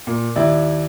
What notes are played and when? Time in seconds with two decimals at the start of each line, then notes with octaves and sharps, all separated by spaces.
0.07 A#2
0.36 D#2 E4 D5